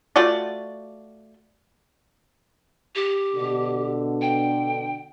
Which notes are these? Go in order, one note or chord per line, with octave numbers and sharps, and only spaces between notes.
A3 F4 F#4 D5
G4
B2 D3
G5